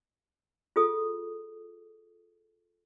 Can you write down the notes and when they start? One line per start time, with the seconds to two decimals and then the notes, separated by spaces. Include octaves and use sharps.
0.76 F4 G#4 A4 D#6